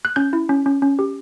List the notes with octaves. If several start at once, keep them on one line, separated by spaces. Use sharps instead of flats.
F#6
C#4 G6
E4
C#4
C#4
C#4
G4